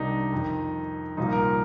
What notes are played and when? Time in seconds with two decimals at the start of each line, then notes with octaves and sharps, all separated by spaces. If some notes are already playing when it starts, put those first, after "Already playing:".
Already playing: C2 C3 D#3 D4 D#4
0.33 F2 D#3
1.17 C2 A#2 F3 D#4
1.33 A#4